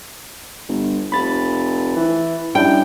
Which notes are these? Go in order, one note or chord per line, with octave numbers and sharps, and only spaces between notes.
G1
F1 B5 A6
E3
G2 C#4 D4 E4 G5